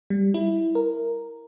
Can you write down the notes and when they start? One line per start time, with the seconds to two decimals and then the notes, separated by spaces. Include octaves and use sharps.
0.10 G3
0.34 E4
0.75 A#4